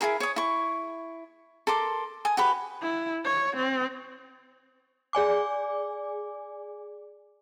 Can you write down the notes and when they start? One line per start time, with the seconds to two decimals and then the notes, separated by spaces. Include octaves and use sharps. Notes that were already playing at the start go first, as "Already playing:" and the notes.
0.01 E4 F#4 G#4 A#4
0.20 C#5 D#6
0.36 E4 C#6
1.67 A4 A#4 C6 D6
2.25 G#5 D#6
2.37 F#4 G4 B4 B5
2.82 E4
3.25 C#5
3.56 C4
5.13 G#4 D5 G#5 D6